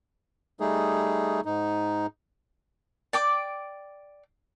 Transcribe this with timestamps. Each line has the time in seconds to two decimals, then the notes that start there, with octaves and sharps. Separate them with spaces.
0.60 G3 A3 D#4 G#4
1.45 G#2 D#4
3.13 D5 G5 D6